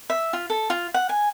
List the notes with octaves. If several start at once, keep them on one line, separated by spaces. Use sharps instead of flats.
E5
F4
A4
F4
F#5
G#5